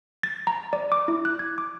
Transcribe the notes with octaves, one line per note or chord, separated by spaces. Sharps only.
A6
A#5
D5
D6
E4
F#6
G#6
D6